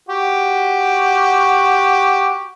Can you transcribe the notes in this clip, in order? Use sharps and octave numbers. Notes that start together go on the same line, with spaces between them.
F#4 G4